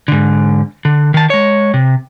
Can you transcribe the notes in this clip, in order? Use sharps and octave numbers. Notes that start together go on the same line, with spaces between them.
G#2 D3
D3
D#3 A5
G#3 C#5
C3